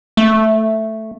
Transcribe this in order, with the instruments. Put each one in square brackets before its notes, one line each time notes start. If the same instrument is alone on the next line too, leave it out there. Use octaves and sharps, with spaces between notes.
[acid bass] A3